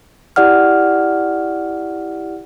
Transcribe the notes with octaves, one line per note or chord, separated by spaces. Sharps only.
E4 G4 D5 F#5 F6